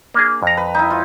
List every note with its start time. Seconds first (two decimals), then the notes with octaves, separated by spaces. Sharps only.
0.14 A#3 D4 G#4
0.43 F2 A#5
0.57 B4
0.74 D#4 E4
0.90 F4